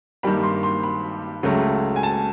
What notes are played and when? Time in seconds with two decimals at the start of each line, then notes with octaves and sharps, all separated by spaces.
0.23 G2 D#3 G3 A#3 B5
0.43 C6
0.63 C6
0.83 B5
1.43 C#2 C#3 F#3 A3
1.96 G#5
2.03 A5